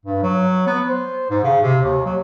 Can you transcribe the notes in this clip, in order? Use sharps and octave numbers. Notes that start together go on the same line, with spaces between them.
G2
F#3
B3
C5
G#2
C#3
C3
D#2
F#3